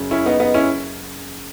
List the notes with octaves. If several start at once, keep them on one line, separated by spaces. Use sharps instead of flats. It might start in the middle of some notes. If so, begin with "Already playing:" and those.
Already playing: F#1 F#2 C#3
C#4 E4
B3 D#4
B3 D#4
C#4 E4